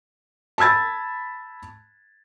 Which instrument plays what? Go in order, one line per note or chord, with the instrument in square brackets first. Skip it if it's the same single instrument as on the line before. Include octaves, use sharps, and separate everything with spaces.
[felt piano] A5 B5 E6 G#6 A6